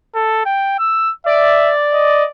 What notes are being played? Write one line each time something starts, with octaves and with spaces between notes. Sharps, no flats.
A4
G5
E6
D5 E5
D#5